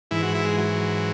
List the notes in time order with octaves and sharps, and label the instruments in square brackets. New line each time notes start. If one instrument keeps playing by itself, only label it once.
[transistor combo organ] G#2 E3 E4
F#4
E4
G#3
F#3